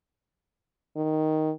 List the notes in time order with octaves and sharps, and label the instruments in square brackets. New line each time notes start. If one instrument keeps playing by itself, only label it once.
[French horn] D#3